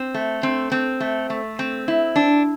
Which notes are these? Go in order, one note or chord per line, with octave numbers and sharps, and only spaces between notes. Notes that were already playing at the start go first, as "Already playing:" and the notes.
Already playing: C4
A3
C4
C4
A3
A3
C4
E4
D4